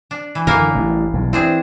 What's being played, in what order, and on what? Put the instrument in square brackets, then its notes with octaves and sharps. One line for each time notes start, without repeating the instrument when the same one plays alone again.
[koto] D4
E3
[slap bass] F#2 D3 [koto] E3 A#3 A#4
[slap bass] A1 G2
B1 G2
[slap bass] E3 [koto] C4 D4 G#4